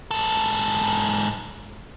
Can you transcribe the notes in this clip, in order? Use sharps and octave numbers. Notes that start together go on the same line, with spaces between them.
G#2 A4